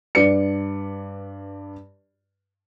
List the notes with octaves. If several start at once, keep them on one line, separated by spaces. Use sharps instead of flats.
G2 B4 D5 C#7